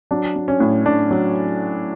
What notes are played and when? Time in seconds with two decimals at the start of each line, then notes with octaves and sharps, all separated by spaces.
0.11 F#3 D4
0.36 F#3
0.48 C#4
0.60 A2
0.85 A2 D4
1.11 F#3